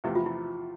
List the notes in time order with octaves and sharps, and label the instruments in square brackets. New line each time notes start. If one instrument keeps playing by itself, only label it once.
[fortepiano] E2 C3 F3 A3 [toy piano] E4
[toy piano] F4
E4